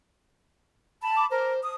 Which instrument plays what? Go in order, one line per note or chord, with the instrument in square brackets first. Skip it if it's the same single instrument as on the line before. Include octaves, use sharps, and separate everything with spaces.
[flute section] A5 B5
[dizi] D6
[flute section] A#4 [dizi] C5
[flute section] D#6